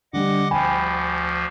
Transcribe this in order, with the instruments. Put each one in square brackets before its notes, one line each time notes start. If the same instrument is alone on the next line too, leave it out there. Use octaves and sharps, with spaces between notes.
[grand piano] D3 G3 [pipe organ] D#5 F#5 D6
[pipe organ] D2 F3 [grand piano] G5 G#5 B5